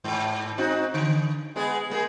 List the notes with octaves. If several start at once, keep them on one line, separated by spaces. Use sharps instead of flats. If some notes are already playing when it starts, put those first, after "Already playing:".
G#2
C4 D#4 F#4
D3
G#3 B3 G#4
G#3 A#3 G#4